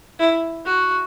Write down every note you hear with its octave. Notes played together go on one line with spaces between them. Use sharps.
E4
F#4